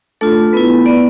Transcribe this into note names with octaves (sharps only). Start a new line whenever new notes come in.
A3 D4 F4 A4
B3 E4 B4
B3 E4 D5